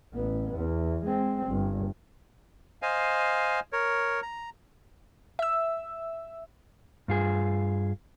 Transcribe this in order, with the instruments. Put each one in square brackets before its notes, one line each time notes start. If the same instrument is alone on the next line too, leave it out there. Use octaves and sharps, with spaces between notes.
[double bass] A1 B3
E2
G#3 C4
G1
[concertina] C5 D#5 F5 G#5
A#4 C#5
A#5
[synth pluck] E5 E6
[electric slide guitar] G2 F4 G#4